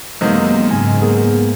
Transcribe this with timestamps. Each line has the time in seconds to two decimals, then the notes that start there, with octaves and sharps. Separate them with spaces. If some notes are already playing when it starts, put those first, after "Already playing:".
0.21 F#2 C3 D#3 G#3 A#3 B3 C5 D#5
0.71 G#2 C#3 G#5
1.01 A#3 B3 G#4 A#4